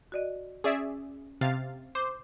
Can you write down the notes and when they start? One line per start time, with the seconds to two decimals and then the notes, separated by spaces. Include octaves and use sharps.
0.12 F#4 D5 D#5
0.64 C#4 G#4 D5 E5
1.41 C3 F5 A6
1.95 C5 D6